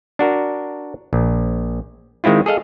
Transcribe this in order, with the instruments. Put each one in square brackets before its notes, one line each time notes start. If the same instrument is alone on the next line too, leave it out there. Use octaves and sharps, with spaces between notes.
[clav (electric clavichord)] D4 F#4 A#4
A#1
D#3 G#3 C4 E4 F4
G#4 A4 D#5 F5